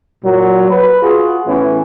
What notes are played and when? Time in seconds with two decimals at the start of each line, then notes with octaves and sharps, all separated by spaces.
0.23 A#2 F#3
0.70 B4
1.02 F4 F#4 G#4
1.46 A2 E3 B3 C#4